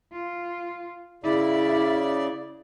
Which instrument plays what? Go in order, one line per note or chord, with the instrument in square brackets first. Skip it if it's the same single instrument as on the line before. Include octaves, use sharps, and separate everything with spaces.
[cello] F4
[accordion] C#3 D5 [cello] E4